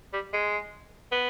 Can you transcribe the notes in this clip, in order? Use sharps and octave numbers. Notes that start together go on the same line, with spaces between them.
G3
G#3
B3